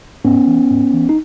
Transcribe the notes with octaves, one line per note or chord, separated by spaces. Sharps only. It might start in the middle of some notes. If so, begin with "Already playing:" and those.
G#2 B3 C#4
E3
G#2
E3
D#4